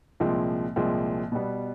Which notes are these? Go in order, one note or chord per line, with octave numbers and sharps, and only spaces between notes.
C2 A#2 F3 G#3 C4
C2 A#2 F3 G#3 C4
B2 G3 B3